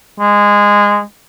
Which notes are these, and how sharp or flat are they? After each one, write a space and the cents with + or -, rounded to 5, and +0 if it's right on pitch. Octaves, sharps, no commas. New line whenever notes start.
G#3 -15